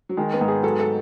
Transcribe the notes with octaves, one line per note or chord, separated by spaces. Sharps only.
F#3
D#3 G#3
B3
G#2
G#4
F#3 A4
A4